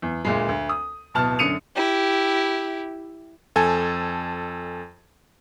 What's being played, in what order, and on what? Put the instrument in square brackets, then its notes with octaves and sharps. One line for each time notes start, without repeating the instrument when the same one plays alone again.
[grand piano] E2
D2 A#2 G#3
D2
D#6
D1 B2 A5 F6
F#2 D3 D#6 C#7 D#7 F7
[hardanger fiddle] E4 G4
[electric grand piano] F2 A4 G#5 G#6